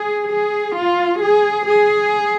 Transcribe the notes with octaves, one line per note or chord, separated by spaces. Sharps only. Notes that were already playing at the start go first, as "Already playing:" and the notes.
Already playing: G#4
G#4
F4
G#4
G#4